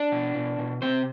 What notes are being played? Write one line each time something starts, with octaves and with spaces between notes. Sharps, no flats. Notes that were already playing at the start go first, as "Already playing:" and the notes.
Already playing: D4 D5
B2
B2
B2
C3 C4 C5